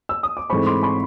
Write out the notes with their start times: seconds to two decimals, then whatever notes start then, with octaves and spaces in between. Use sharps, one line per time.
0.09 E6
0.23 D#6
0.37 D6
0.50 G#2 E3 A3 C4 B5 C#6
0.66 C6 D6
0.83 B5 C#6